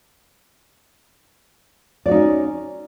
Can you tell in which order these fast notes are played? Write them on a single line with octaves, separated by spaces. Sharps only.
D5 F#4 D#4 C#4